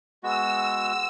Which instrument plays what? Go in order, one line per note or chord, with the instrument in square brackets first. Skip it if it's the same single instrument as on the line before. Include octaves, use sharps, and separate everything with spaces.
[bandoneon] G#3 B3 F#4 [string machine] E6